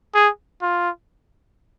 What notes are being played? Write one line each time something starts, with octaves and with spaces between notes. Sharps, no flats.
G#4
F4